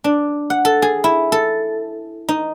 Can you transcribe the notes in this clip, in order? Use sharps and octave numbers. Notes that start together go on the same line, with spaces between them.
D4
F#5
A4
G#4
E4
A4
D#4